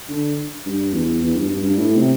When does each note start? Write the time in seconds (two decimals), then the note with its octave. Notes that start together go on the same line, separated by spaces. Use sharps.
0.09 D3
0.66 G2
0.93 E2
1.22 E2
1.35 G2
1.49 G2
1.63 G2
1.77 A2
1.96 C3